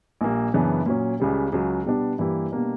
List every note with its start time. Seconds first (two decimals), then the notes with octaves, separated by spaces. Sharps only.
0.21 A#1 A#2 G3 A#3
0.53 F#2 C#3 E3 B3 D4
0.86 A#2 F#3 C#4
1.20 C#2 C#3 G3
1.52 C#2 C#3 F#3
1.86 B2 G3 B3 D4
2.19 G2 E3 A#3 E4 G4
2.52 B2 G3 A#3 D4